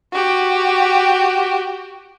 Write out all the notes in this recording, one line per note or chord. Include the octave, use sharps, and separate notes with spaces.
F#4 G4